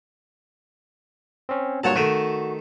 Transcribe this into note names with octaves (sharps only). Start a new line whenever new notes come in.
C4 C#4
G2 A#2 F#3 C#5 F#5 A5
D#3 A3 F#4